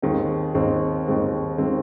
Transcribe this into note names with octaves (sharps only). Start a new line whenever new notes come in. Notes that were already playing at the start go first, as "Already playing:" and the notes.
D#2 D#3 G#3 C4
D#2 D#3 G#3 C4
D#2 D#3 G#3 C4
D#3 G#3 C4